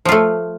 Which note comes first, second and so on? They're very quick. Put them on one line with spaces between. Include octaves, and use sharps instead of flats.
F3 F4 A3